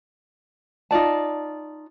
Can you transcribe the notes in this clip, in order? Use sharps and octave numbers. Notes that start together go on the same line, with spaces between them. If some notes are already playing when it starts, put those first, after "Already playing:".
D#4 F4 D5 A5